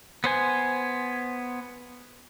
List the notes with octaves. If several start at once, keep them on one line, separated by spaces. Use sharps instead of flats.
B3 C5 G#5